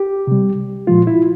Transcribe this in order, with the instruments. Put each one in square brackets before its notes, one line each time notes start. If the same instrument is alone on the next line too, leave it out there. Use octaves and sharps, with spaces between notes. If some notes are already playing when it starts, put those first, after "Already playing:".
Already playing: [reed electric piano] G4
C3 G3
A#2 F3 G#3 F4
E4